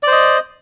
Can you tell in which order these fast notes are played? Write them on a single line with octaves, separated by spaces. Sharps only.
D5 C5 D#5